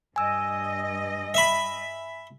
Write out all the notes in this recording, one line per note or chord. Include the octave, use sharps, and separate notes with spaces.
G2 D#5 G#5 E6
E5 B5